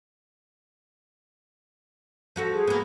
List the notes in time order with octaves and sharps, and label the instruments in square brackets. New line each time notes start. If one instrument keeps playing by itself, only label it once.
[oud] F3 F#4 A4
[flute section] G#4
[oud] A#3 B3